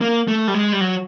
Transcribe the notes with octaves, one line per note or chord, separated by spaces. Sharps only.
A#3
A3
G3
G#3
G3
F#3